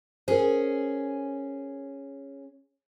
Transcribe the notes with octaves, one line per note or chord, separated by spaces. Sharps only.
C#4 G#4 A#4 C5